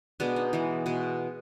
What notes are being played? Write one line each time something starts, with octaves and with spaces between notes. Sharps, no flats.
B2 G#3 B3 D4
D#4
E3 G#3 B3
B2 G#3